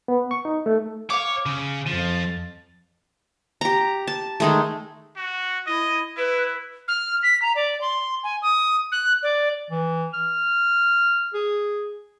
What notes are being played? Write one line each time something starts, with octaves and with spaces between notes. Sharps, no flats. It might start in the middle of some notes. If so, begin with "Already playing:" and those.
B3
C#6
D#4
A3
C#5 F5 D6
C#3
F2 F3 A6
G4 A#5
A5
D#3 G#3 A3
F#4
E4 D#5
E4 B4
F6
B6
A#5
D5
C6
G#5
D#6
F#6
D5
E3
F6
G#4